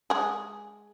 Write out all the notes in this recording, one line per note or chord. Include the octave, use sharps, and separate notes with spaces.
G#3 G#4